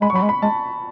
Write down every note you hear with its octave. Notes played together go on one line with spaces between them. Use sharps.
G#3 B5
C#6
F#3 B5
G#3
B5
G#3 A5